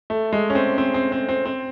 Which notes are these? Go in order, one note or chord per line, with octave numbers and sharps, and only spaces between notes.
A3
G#3
C#4
C4
C4
C4
C4
C4
C4